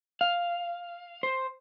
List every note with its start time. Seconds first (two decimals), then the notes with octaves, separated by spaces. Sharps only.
0.21 F5
1.23 C5